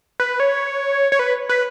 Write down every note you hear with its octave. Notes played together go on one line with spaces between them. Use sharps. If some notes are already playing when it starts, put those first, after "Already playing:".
B4
C#5
C#5
B4
B4